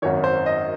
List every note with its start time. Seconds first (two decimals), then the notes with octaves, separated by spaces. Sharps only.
0.02 G#1 F#2 D#3 C#5
0.24 C5
0.46 D#5